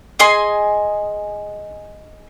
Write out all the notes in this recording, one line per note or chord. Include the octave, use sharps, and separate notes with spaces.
G#4 D#5 G#5 C6